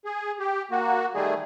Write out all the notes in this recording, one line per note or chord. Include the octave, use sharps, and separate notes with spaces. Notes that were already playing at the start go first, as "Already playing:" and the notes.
G#4
G4
A#3 F#4
D#3 G3 A3 G#4